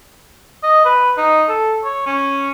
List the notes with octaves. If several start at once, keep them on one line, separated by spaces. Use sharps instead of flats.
D#5
B4
D#4
A4
C#5
C#4